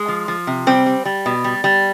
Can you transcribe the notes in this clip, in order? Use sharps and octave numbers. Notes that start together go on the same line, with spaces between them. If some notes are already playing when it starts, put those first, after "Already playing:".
Already playing: G#3
F3
F3
C3
G3 C4
G3
G3
B2
G3
G3